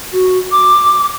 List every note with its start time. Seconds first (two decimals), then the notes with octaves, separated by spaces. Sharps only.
0.12 F#4
0.51 D6